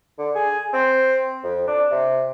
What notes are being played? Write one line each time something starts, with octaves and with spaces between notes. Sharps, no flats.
D3
G#4
C4
F2
D4
C3